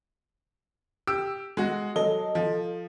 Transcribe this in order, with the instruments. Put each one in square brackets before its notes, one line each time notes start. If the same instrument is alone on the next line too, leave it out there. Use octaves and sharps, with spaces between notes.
[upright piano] G4 E6 D7
G#3 F#4
[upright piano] F#3 G7 [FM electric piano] A4 D#5
[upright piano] F3